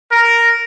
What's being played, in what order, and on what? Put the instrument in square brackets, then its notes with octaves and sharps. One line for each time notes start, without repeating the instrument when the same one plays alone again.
[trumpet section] A#4